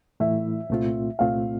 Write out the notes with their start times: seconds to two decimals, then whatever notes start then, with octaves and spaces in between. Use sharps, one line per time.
0.20 A2 E3 A3 E4 E5
0.70 C2 A#2 A3 C4 F4
1.19 C2 A#2 A3 C4 F4 F5